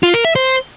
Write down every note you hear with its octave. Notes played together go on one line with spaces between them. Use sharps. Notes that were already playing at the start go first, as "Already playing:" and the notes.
F4
A#4
E5
C5